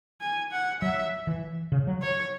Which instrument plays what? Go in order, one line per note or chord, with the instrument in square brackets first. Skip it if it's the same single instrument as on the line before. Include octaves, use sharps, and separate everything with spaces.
[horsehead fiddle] G#5
F#5
[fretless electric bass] F#3 [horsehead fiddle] E5
[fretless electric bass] E3
C#3
F#3
[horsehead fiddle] C#5